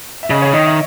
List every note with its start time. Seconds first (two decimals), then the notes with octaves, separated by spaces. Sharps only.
0.23 E5
0.30 C#3 D#5
0.42 C#5
0.53 D#3 D#5
0.66 E5